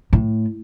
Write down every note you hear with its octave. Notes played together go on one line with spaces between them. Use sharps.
A2